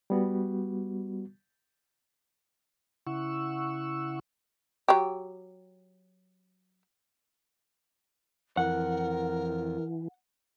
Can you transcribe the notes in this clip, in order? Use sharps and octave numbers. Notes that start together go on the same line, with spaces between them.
G3 B3 F#4
C#3 E4 F#5 C#6 E6
F#3 G4
F2 E3 A#4 F#5